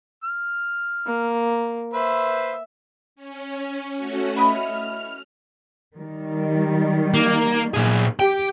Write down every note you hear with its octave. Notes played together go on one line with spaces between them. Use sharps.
F6
A#3
B4 C5 E5
C#4
A3 C#4 F#4
E4 B4 D#5 F6
D#3 G3
A#3
A#2 G#4
G4 G5